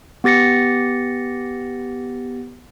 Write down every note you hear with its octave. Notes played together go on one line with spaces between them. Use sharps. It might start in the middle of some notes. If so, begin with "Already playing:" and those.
B3 G4 A6 A#6 C#7